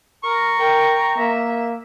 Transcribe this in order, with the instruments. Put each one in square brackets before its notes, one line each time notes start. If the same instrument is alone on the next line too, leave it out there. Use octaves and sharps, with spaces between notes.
[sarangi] A#4 [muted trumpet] A#5 [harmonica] C#6
[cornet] A#4 [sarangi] G5
[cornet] A#3 [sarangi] E5